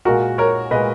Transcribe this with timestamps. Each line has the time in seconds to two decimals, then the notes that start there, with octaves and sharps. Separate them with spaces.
0.05 A#2 G#3 F#4 A#4
0.38 A#4 C#5
0.71 A#2 G#3 B4 D#5